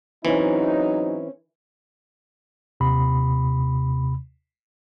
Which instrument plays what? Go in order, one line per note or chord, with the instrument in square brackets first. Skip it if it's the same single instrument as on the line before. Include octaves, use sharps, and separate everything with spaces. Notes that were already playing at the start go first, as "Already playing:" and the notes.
[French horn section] G#2 F#3 D#4 [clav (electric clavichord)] E3 [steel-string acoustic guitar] C4 C#4
[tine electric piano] D#2 C3 B5